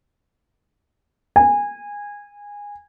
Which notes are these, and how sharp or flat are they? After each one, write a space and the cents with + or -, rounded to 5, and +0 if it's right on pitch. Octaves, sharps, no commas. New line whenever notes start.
G#5 -20